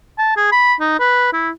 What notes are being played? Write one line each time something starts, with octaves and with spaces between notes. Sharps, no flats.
A5
G#4
B5
D#4
B4
E4